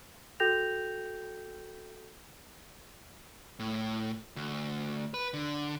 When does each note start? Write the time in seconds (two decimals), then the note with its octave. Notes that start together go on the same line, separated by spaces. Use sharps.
0.40 F#4 A4 G5 G6 A#6 F7
3.59 A2
4.36 D2
5.14 B4
5.34 D3